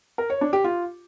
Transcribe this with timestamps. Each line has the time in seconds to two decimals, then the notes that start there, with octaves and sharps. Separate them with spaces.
0.18 A#4
0.30 C#5
0.41 D4
0.53 G4
0.64 F4